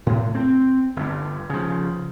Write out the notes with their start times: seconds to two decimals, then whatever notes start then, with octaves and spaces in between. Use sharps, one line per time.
0.06 A2
0.35 C4
0.96 G1 G2
1.50 C#3 F3